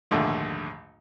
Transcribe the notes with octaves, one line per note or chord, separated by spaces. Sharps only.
A#1 D#2 G#2 D3 A3